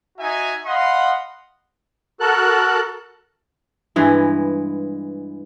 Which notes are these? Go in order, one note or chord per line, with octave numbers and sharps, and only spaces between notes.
D#4 F#4 E5 G#5
D#5 F5 F#5 B5 C6
F#4 A4 A#4 A5 F#6
G2 E3 G#3